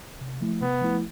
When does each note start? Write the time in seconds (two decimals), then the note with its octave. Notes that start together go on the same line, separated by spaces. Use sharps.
0.21 C3
0.41 F3 A3 E4
0.61 C3 B3
0.82 F3 A3 E4